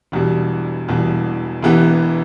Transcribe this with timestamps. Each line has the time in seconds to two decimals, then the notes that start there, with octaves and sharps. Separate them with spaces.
0.12 E1 E2 B2 G3
0.88 E1 E2 B2 G3
1.63 E1 E2 E3 B3 G4